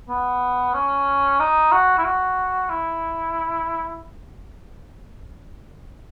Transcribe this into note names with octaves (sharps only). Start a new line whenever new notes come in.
B3
C#4
D#4
F#4
E4
F#4
E4